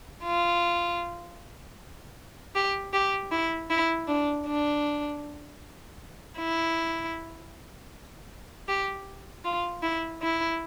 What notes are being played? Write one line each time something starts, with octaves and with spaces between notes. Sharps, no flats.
F4
G4
G4
E4
E4
D4
D4
E4
G4
F4
E4
E4